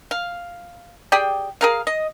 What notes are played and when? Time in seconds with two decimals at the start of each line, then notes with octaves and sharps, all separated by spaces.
0.11 F5
1.12 G4 G#4 D5 G5
1.61 G#4 A#4 F5
1.87 D#5